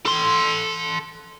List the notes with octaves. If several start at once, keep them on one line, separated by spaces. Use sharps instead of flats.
A4 C6